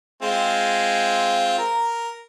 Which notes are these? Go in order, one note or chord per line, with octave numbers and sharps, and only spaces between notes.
G#3 C4 F4
A#4